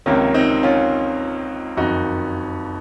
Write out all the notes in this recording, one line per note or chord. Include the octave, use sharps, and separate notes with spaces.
C#2 C3 D#3 A#3 C#4
C4 D#4
C#4 F4
F#1 F2 D#3 D#4 F#4